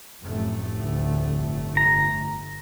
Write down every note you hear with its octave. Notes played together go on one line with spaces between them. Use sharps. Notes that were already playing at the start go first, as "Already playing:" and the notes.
F1 F#2 A2 A3
D2
G1
A#5